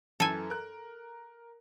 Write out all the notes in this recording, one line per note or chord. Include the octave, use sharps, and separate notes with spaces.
F#2 E3 A4 G#5
A#4 F#6